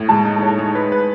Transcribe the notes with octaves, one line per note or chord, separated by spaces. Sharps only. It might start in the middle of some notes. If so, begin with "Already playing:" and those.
Already playing: A2
G#3 A5
D#4
C#5
G#3
B4
B4